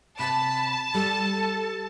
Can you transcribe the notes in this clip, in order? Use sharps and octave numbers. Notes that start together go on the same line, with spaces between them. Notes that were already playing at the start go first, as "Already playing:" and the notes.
C3 A5 B5
G3 A4